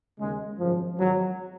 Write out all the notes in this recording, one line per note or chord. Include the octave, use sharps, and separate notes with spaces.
D#2 C#3 G#3
G#1 F#2 C#3 F3
G#1 G#2 D#3 F#3